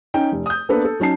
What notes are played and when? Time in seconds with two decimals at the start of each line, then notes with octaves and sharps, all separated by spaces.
0.14 C#4 D#4 G5
0.32 F1
0.46 D#6 G6
0.69 A#3 B3 D4 A4 B4
0.85 A4
1.00 F#3 C#4 D#4 A5 C7